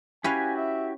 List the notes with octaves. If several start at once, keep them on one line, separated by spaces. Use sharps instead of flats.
C#4 E4 F#4 G4 B4 F5 G#5
E5